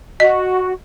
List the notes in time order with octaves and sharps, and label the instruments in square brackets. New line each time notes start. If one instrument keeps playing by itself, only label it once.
[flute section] F#4 [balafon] D#5